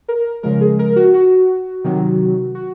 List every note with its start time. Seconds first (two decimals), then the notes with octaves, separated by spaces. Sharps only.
0.08 A#4
0.43 C#3 F3 G#3 A#4
0.61 G#4
0.79 A#4
0.96 F#4
1.14 F#4
1.84 C3 D#3 F#3
2.55 F#4